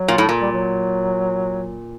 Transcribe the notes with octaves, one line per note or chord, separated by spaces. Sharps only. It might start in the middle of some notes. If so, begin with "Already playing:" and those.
Already playing: F#3
A#2
A2
A#2
G3
F#3